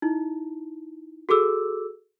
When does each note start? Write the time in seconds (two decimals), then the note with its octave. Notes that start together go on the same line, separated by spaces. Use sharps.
0.02 D#4 E4
1.29 F#4 G#4 A4 D6 E6